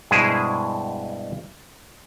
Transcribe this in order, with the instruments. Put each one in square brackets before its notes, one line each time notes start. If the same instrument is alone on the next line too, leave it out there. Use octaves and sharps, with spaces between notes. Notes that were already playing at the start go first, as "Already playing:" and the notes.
[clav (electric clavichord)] G2 B2 G#3 E4 G#4 C5